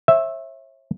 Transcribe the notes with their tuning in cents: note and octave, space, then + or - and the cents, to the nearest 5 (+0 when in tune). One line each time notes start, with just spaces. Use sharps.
C#5 -45 E5 +0